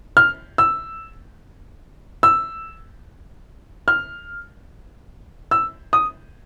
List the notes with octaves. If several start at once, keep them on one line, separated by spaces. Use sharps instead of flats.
F6
E6
E6
F6
E6
D#6